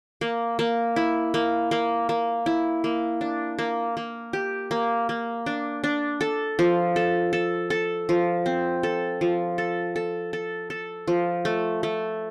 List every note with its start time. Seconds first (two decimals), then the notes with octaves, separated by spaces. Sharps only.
0.21 A#3
0.59 A#3
0.96 E4
1.34 A#3
1.71 A#3
2.09 A#3
2.46 E4
2.84 A#3
3.21 D4
3.59 A#3
3.97 A#3
4.33 G4
4.71 A#3
5.09 A#3
5.46 D4
5.84 D4
6.21 A4
6.59 F3
6.96 A4
7.33 A4
7.70 A4
8.09 F3
8.46 C4
8.83 A4
9.21 F3
9.58 A4
9.96 A4
10.33 A4
10.70 A4
11.07 F3
11.45 A3
11.83 A3